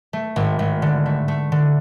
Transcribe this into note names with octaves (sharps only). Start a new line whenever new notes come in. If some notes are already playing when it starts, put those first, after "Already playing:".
A3
G#1
G#1
D3
A3
A3
D3